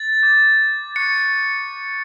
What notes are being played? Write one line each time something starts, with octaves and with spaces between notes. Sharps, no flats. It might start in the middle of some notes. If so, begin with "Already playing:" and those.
Already playing: A6
D6 G6
C#6 F#6 C#7